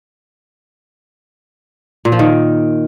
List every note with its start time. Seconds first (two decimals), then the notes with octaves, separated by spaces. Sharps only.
2.05 A#2
2.12 F3
2.19 D#3